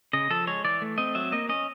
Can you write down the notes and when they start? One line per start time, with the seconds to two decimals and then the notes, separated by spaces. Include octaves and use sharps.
0.13 C#3 D#5
0.30 F3 A4
0.47 G#3 C#5
0.64 E3 D5
0.82 A3
0.98 C4 D#5
1.15 F#3 E5
1.32 A#3 D#5
1.49 C#4 D#5